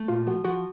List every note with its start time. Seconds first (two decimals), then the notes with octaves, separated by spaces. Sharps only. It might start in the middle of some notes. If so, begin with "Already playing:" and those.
Already playing: A3
0.08 A#2 F4
0.27 F3 F#4
0.45 F3 F#4